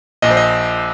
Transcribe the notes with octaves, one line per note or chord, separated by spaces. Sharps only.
A#1 A#2 D#5
C5
D#5